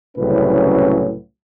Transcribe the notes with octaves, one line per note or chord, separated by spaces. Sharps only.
C2 A2 C#3 F#3 C#4 B4